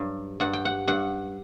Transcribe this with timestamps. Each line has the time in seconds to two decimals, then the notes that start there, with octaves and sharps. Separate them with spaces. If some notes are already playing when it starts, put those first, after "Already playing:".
Already playing: G2 F#3
0.40 G2 F#5
0.53 G5
0.65 F#5
0.88 G2 F#5